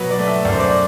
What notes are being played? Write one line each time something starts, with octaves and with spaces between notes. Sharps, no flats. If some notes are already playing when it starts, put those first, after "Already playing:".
Already playing: B2 F#3 B4
D5
A3
E5
F#2 D5
C5
D5